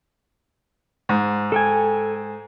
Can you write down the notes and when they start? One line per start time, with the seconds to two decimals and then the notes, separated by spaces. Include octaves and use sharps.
1.09 G#2
1.52 A4 G5 G#5